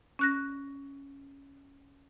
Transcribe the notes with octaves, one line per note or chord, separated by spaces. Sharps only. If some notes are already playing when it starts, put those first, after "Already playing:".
C#4 F#6 A#6